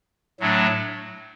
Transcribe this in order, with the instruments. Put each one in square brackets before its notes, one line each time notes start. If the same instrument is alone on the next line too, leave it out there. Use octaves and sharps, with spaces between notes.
[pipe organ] A2 F#3 A3 D4